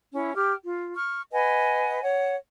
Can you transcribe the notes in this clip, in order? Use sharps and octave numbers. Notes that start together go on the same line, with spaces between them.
C#4 E4
G4 G5 F6
F4
C#6 F6
B4 D#5 F#5 G#5
C#5 F#5